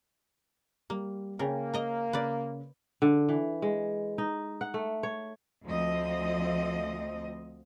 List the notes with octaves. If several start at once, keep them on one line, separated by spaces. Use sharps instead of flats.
G3 A#3
C#3 A#3 A#4 C#5 G5 G#5
A#4 D#5 A#5
C#3 B4 D5
D3
E3
G#3
D#4
F#5
A3
C#5
D2 F3 C4 D#5